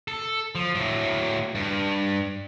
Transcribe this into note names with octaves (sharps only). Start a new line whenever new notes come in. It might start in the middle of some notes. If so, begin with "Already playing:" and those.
A4
F3
A2 F#3
G2